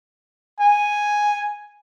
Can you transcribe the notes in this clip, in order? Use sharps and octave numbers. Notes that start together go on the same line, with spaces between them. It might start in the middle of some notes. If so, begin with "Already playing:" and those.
G#5